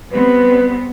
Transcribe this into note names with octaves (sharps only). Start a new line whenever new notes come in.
G3 B3 C4 B4